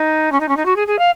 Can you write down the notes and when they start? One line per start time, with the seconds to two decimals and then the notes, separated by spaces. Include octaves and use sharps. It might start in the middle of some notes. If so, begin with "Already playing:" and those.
Already playing: D#4
0.32 C#4
0.40 D#4
0.48 C#4
0.57 D#4
0.65 F#4
0.76 G#4
0.87 G#4
0.99 F5